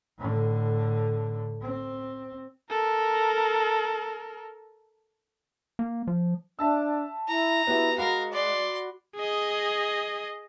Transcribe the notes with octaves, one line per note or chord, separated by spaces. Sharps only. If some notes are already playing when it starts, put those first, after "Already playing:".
A2 D3
C4
A4 A#4
A#3
F3
D4 E5 A5 E6
E4 A#5
B3 E4 F#4 G4
G#3 F#4 A#4 F5 B5
D5 C6
G#4 D#5